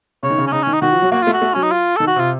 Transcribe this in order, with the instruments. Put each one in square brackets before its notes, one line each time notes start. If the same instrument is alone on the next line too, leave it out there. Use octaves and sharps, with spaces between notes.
[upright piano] C#3 [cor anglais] C#5
[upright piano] D#3
C#3
[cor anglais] C#4
[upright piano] C#3 [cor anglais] D#4
[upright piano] D#3 [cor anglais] C#4
[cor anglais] D#4
[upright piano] D#3 [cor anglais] F#4
[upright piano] F3
F#3
[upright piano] A#3 [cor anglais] F#4
[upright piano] A3 [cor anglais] F4
[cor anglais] F#4
[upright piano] A3
[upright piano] F#3 [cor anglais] C#4
[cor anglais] D#4
F4
[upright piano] D#3 [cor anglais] A4
[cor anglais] F#4
[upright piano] C3 [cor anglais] F4